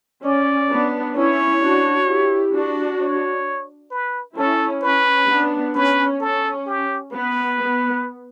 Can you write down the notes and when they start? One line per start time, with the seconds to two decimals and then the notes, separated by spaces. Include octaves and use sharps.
0.24 C#4 D5
0.70 B3 D4
1.16 C#4 E4 C#5
1.62 D4 F#4
2.07 E4 G4
2.53 D4 F#4
3.00 C#5
3.91 B4
4.37 C#4 E4 A4
4.82 C#4 B4
5.29 B3 D4
5.75 C#4 B4
6.20 C#4 A4
6.66 G4
7.12 B3 B4
7.58 B3